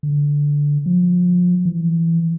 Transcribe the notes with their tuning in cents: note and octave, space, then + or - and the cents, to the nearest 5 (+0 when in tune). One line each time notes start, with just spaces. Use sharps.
D3 -10
F3 +30
E3 +10